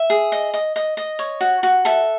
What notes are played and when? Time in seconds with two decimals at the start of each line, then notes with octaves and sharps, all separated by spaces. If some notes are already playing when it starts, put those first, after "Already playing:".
Already playing: E5
0.10 G#4
0.32 D#5
0.54 D#5
0.76 D#5
0.97 D#5
1.19 C#5
1.41 F#4
1.63 F#4
1.85 A4 E5